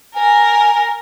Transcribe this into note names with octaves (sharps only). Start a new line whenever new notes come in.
A#4 G#5